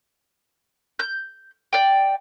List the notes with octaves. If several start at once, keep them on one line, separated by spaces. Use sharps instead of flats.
G6
D5 G5